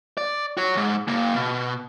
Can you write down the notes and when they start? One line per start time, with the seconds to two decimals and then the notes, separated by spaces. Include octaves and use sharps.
0.18 D5
0.57 F#4 C#5
0.74 C#2 G#2
1.08 C#3 A#3
1.36 B2